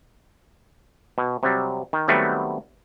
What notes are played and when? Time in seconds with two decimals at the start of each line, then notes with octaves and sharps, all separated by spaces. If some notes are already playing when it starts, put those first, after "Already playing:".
1.18 B2
1.43 C3 F#3 G3
1.93 D#3
2.08 D#3 F#3 G3 A3 B3 C4